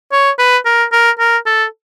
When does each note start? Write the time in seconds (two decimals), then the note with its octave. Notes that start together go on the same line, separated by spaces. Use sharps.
0.12 C#5
0.39 B4
0.66 A#4
0.92 A#4
1.19 A#4
1.46 A4